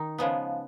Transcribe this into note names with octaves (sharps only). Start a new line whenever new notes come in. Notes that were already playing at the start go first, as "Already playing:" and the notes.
Already playing: D#3 D#4
C#3 F3 G#3 B3